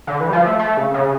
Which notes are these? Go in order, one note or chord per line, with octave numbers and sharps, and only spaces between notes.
D3
E3
G3
F3
A3
A3
C#3
C#3